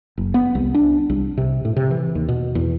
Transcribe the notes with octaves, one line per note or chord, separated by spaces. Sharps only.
F#1
B3
C2
D4
C2
C3
A2
C3
E3
D#2
B2
E2